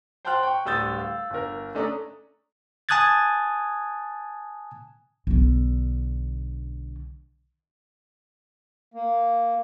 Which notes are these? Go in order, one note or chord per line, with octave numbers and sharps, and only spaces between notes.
C5 G5 A5 C6 F6 F#6
G5 C#6
D1 G3 D#6 E6 G6 A6
F5
G1 A#4
A3 C#4 D4 A4 A#5 D#6
G#5 A5 D#6 F#6 G#6 A6
B1 D3
A#3